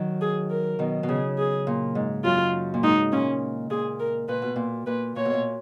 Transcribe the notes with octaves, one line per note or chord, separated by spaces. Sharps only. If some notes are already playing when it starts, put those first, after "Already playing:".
Already playing: D#3 F#3
G#4
A#4
B2 D#3
B2
C#3 G#4
G#4
A#2
G#2
F#2 F4
A#2
G#2 D#4
A#2 C#4
A#2 G#4
A#4
A#2 B4
B2
A#2
A#2 B4
A#2 C#5
B2
A#2